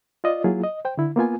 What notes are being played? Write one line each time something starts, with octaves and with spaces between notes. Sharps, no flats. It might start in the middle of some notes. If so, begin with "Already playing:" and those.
F4 D5 D#5
F#3 A#3 E4 F4 G#4
D#5
C5 G5
D3 E4
A#3 B3 F4 G#5